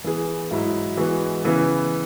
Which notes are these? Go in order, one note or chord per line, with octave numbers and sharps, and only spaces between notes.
E3 B3 G#4
G#2 F#3 E4
E3 G#3 B3 F#4
C#3 E3 B3